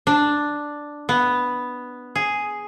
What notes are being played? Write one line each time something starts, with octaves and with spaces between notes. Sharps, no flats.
D4
B3
G#4